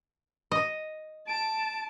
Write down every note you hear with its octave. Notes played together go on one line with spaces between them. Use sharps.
D#5
A5 D7